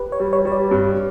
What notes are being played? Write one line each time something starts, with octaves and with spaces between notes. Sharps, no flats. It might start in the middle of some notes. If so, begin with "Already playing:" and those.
Already playing: G4 B4
C#5
G3
C#5
G3 C#5
D5
G2